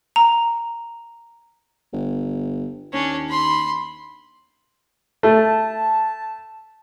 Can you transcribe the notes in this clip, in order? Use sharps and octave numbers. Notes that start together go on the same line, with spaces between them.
A#5
G1
D#2 C#4 D4
B5 C6
A3 A5